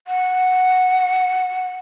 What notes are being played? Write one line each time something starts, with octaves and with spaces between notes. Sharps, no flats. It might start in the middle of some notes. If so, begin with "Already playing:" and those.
F#5